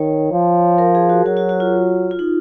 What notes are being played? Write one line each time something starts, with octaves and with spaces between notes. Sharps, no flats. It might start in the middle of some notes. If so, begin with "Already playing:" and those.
Already playing: D#3 C#5
F3
A#4
G#4
F#4
F#3 F#4
F#4
F#4
F4
F4
D#4